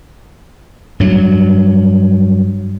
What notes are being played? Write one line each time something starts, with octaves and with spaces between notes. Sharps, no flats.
G2 F#3